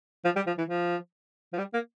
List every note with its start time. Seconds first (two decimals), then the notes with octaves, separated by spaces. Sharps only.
0.25 F3
0.36 G3
0.47 F3
0.58 E3
0.69 F3
1.53 F3
1.58 G3
1.73 A#3